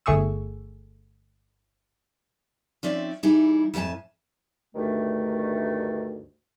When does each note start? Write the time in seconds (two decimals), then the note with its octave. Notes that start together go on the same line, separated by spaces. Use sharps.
0.06 G1 A3 G#4 C#6 E6
2.83 F3 C4 C#4 D#4 D5 E5
3.23 E3 G3 D#4 E4 G#4
3.74 F2 A2 G4 G#5 A5
4.75 D2 G2 D#3 A3